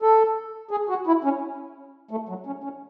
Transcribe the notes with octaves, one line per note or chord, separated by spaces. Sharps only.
A4
G#4
F#4
E4
C#4
A3
F#3
C#4
C#4